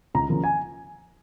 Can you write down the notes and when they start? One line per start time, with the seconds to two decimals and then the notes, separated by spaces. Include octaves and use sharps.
0.14 C#2 A#5
0.29 C#3 F3 A#3
0.44 G#5